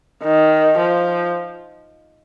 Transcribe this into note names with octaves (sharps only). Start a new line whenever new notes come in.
D#3
F3